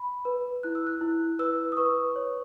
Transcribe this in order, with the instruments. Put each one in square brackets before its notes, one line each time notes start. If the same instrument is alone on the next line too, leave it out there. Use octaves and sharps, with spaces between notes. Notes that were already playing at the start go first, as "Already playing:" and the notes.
Already playing: [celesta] B5
B4
E4 F#6
E6
F#6
E4
B4 E6
D#6
B4 C#6
C#5